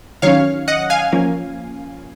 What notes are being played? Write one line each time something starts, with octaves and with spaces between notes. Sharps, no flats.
D#3 F#3 C#4 C#5 F5
D#5 F#5
F5 G#5
F3 A#3 C#4